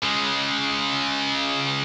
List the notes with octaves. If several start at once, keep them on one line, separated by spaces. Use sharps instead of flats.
C#3 G#3